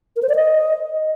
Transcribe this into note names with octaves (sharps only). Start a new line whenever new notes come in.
A#4
C5
D5
D#5